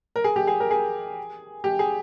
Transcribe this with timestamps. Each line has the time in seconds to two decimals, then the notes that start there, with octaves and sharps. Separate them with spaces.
0.16 A#4
0.24 G#4
0.36 G4
0.47 G#4
0.60 A#4
0.71 G#4
1.64 G4
1.79 G#4